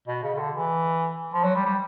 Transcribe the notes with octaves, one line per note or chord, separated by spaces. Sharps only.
B2
C#3
C#3
D3
E3
F3
F#3
G3
G3